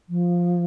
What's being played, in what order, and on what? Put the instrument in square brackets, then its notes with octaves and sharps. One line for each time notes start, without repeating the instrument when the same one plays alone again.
[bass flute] F3